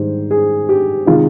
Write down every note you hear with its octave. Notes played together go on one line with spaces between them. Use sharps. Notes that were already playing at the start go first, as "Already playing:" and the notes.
Already playing: G#2 D#3 G3 C5
G#4
G4
C3 D#3 G#3 F4